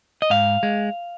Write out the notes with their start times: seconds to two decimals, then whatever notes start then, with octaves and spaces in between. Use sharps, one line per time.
0.22 D#5
0.30 G#2 F5
0.63 G#3